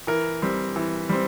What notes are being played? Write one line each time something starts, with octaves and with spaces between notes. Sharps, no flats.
E3 A#4
G3 C4
E3
G3 C4